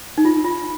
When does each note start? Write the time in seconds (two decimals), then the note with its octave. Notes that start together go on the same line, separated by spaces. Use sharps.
0.18 D#4
0.25 F4
0.44 F4